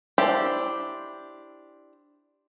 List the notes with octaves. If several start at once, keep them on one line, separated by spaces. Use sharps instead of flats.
D4 E4 G4 C5